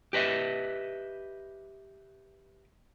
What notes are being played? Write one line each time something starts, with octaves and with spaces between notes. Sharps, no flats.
G4 B4 D#5 E5